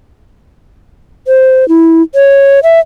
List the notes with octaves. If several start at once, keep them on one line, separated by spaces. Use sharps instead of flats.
C5
E4
C#5
E5